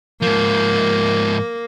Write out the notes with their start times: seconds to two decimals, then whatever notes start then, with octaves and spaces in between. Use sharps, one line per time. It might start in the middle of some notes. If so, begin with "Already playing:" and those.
0.22 G#2 F3 A#3